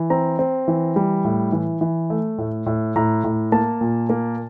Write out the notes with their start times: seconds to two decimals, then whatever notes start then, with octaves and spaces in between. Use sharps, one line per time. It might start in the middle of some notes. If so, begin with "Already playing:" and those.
Already playing: E3
0.10 C4 A#5
0.39 C4
0.68 E3
0.96 G3
1.25 A2
1.52 E3
1.81 E3
2.10 A3
2.38 A2
2.66 A2
2.96 A2 A#5
3.24 A2
3.52 A#3 A5
3.81 A#2
4.10 A#3